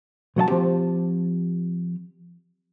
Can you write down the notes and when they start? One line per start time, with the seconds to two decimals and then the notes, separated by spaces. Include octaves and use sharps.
0.36 B1 F#3 D#5 A5
0.48 F3 C4 G4